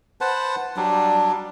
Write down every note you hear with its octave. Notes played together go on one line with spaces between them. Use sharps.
B4 C5 F#5 A5
F#3 G3 D4